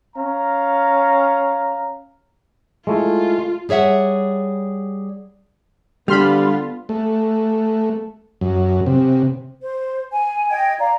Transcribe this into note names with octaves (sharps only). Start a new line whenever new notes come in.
C#4 F5 A#5
G#3 A3 E4 F4
G3 G#4 C#5 E5 F#5
D3 G3 B3 F4 B5 C6 F6
A3
F#2
C3
C5
G#5
D#5 G5 G#6
D5 F5 A#5